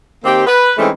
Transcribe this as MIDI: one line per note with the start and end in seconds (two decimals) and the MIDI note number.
0.24 0.42 51
0.24 0.42 58
0.24 0.42 60
0.24 0.42 67
0.47 0.72 71
0.78 0.89 52
0.78 0.89 56
0.78 0.89 57
0.78 0.89 60
0.78 0.89 61
0.78 0.89 63